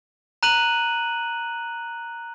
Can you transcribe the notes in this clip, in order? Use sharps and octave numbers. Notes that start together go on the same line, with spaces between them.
A#5 F#6 D#7 F#7